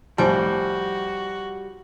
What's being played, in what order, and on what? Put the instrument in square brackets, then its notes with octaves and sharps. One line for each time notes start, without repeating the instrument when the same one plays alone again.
[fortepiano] C2 F2 A2 [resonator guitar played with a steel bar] G3 [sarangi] F#4 [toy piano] C5 G#5 A5